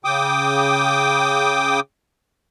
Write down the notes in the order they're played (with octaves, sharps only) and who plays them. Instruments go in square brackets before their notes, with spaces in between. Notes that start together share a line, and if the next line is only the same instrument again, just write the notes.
[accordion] C#3 G5 D6 D#6